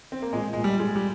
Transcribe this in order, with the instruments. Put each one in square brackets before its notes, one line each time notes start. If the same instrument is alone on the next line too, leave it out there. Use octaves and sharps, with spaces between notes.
[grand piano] C4
A#3
[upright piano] A#2 [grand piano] G#3
[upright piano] A#2 [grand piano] G#3
[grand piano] G3
[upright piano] G#3
[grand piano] G3